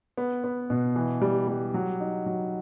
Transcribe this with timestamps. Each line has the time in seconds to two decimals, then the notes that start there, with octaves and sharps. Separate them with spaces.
0.17 B3
0.44 B3
0.70 B2
0.96 E3
1.22 G3
1.48 G3
1.74 F#3
2.00 D#4
2.26 F#3